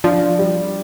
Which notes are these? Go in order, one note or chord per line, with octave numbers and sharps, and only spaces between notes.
F3 D4
G3